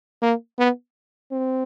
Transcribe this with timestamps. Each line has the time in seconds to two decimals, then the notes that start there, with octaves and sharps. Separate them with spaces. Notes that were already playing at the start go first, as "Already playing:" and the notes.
0.22 A#3
0.59 B3
1.32 C4